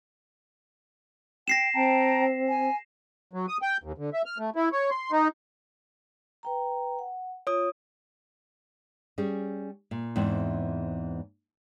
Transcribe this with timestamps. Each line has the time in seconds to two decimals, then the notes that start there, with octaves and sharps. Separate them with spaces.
1.48 G5 A#6 C7 E7
1.74 C4 G5 A5 A#5
2.48 G#5
3.33 F#3
3.48 D#6
3.62 G5
3.83 D#2
3.98 D3
4.13 E5
4.26 F6
4.38 A3
4.56 E4
4.72 C#5
4.91 C6
5.12 D#4
6.43 B4 G5 A#5
6.99 F#5
7.47 F4 C#5 D#6
9.18 G3 C#4 G#4
9.91 A#2
10.16 E2 G#2 E3 C4